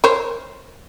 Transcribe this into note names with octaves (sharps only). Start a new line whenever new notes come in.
A#4 C5 C#5